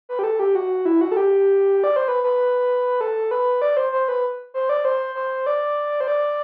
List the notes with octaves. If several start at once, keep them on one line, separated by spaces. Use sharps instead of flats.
B4
G4
A4
G4
F#4
E4
F#4
A4
G4
D5
C5
B4
B4
A4
B4
D5
C5
C5
B4
C5
D5
C5
C5
D5
C5
D5